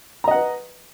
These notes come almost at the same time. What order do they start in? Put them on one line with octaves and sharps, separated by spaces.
A#5 D#5 F#5 B4